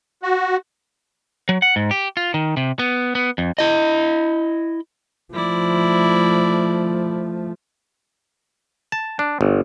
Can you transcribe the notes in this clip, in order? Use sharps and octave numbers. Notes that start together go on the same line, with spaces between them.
F#4
F#3
F#5
G#2
G4
F4
D#3
C3
B3
B3
F2
E4 D#5
F3 A3 E4 D5
A5
D4
G1